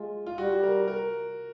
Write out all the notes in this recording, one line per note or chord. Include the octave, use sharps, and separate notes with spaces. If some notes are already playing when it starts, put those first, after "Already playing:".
Already playing: G#3 F4
F4
G3 F#4
A#4
A#4